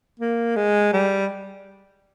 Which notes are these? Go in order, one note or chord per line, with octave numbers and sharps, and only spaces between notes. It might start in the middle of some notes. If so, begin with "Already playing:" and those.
A#3
G#3
G3